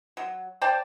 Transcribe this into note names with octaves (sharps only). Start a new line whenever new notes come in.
F#3
C5 D5 G5 A5